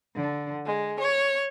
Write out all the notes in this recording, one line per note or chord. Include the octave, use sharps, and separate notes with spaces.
D3
G#3
C#5